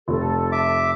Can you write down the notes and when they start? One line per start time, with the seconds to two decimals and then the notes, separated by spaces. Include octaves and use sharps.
0.08 F1 A4
0.52 E5 D6